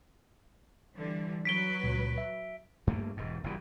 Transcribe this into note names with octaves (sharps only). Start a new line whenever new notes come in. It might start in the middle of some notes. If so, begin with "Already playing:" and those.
D3 E3 G3
F#3 B4 B6 D7 G7
C#2 A#2
E5
G2 A3 A#3
E1 G#2
F#1 G2 E3 G3